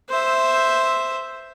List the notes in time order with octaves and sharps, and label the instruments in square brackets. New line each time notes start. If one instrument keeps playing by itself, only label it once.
[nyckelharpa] C5 E5